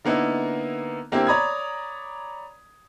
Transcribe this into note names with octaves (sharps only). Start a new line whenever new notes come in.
D3 A#3 B3 D#4 E4 A#4
D3 A#3 C4 E4 G4
C#5 D5 A#5 B5 D#6 G#6